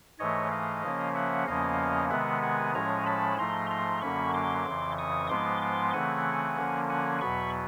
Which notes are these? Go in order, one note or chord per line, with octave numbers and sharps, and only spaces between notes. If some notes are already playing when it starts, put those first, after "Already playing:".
G#2 E3 A3 C#5 D#5
D#5 F5
C#3 F3 A#3 C#4
E5 F#5
E2 C#3 F3 A#3 C#4 D#5 F5
C3 D#3 G#3 B3 E5 F#5
F#5 G#5
A2 F3 G#3 C#4 G#5 A#5
A5 B5
G#2 F3 A3 A#5 C6
A#5 C6
F#2 D3 F#3 A#3 C#4 B5 C#6
C6 D6
F2 C#3 E3
C#6 D#6
G#2 F3 G#3 B3 C6 D6
C6 D6
C#3 E3 A3 C4 F#5 G#5
D3 F3 A#3 C#4
F#5 G#5
E2 B2 F#3 B3 B5 C#6